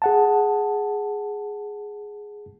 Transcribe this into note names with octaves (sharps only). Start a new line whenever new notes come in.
G#4 F#5 A5